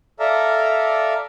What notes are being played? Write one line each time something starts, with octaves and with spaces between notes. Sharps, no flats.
A4 D5 E5 F5 A#5